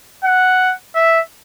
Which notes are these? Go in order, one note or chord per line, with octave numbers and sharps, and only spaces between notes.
F#5
E5